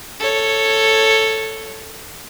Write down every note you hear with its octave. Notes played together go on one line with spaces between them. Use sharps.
A4 C#5